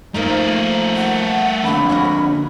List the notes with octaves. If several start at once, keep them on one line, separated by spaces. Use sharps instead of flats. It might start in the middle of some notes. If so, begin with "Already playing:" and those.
F3 A3 A#3 D#4 A#4
F#5
F2 D3 B5
C#4 F#4 A#4